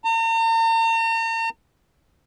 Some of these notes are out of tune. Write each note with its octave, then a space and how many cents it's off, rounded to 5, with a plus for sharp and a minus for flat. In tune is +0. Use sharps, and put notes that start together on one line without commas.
A#5 -45